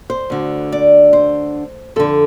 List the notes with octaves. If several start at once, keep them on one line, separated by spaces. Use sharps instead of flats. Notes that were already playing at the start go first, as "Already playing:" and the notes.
C5
D2 D3
D5
C5
F2 D3 A4